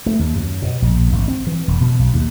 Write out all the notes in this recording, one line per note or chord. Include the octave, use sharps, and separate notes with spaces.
A3
D#2
F#2
B2
A#1
G#1
C4
E3
E1
B2
B1
D#2